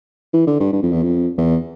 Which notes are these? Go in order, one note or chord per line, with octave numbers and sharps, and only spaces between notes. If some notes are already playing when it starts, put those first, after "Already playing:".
E3
D3
G2
G2
F2
E2
F2
E2